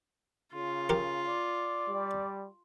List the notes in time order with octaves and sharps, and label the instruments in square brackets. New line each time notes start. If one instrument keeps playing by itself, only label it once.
[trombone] C#3 [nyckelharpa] F4
[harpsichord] G4 A#4
[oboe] D5
[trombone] G3